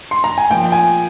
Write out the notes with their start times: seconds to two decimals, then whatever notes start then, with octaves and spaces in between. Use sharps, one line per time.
0.11 C6
0.24 A#5
0.38 G#5
0.50 A#2 F3 G5
0.72 G#5